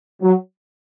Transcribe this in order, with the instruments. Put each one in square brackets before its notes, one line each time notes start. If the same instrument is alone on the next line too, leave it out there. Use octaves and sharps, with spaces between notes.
[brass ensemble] F#3